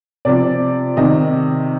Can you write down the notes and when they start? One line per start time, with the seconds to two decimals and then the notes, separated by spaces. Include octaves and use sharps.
0.25 C3 F3 D5
0.97 C3 D#3 D#5